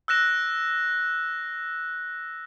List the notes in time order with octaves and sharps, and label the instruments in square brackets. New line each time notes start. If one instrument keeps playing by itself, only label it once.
[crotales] E6 F#6 A#6 E7